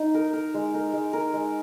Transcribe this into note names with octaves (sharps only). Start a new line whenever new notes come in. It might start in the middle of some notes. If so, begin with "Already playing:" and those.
Already playing: D#4
A#4
A#4
G#3
A#4
G#3
A#4
G#3